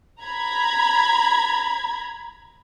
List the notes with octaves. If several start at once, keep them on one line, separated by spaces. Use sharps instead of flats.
A#5 B5 G#6